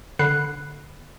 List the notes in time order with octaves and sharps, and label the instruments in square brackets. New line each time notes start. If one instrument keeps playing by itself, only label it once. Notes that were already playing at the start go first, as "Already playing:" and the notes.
[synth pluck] D3 B5 F#6 C7